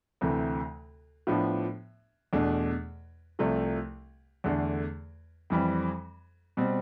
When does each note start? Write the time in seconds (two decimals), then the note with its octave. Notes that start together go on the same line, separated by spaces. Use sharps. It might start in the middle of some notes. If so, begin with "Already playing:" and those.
0.21 D2 C3 E3 A3
1.27 A2 F3 B3 D4
2.33 E2 B2 A3 D4
3.39 C2 C3 F3 A3
4.44 E2 D3 A3 D4
5.50 F2 E3 G3 C4
6.57 B2 G3 C4